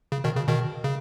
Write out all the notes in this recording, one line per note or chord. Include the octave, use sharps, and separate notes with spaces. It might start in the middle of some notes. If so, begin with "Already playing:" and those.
C#3
B2 D#3
C#3
B2 D#3
C#3